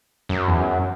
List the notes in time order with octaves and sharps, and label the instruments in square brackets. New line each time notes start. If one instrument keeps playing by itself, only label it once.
[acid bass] F#2
E2
F#2